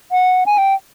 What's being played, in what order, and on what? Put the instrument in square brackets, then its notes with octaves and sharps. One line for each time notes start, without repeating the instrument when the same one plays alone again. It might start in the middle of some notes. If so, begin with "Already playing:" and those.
[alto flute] F#5
G#5
G5